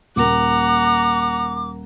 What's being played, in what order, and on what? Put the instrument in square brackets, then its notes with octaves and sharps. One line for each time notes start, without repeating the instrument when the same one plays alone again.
[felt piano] D#1 A#3 [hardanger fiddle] F#5 A#5 [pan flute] D6